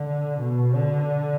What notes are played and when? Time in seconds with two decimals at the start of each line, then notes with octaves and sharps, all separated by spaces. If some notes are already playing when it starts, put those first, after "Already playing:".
Already playing: D3
0.39 B2
0.75 D3